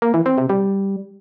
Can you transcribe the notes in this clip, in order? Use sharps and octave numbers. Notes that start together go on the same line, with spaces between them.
A#3
E3
C4
C3
G3